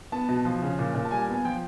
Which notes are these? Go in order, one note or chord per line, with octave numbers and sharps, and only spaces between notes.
B3 A5
B2
F3
C#3
A#2
A#2
A5
G3 G#5
B3
G#5
F3 G5